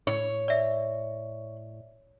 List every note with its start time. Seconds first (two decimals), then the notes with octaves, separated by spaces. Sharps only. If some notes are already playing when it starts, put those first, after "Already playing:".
0.07 A2 C#5
0.48 D5 E5